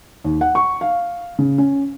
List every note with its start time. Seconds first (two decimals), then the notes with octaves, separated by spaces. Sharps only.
0.24 D#2
0.41 F#5
0.55 C#6
0.81 F5
1.39 C#3
1.58 C#4